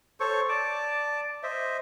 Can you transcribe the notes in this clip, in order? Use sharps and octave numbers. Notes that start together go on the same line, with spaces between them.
A4 C5 C#5 C#6
D5 A5 D6
C5 D#5 E5